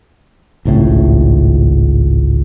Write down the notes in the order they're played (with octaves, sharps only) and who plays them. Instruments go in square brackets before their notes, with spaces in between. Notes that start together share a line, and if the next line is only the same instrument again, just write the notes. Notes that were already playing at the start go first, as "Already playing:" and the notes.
[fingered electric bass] G#1 C#2 A2